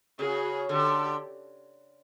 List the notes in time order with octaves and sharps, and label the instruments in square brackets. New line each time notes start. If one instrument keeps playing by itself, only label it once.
[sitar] C#3 [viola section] F#4 G#4
[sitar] D3 [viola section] G4 A4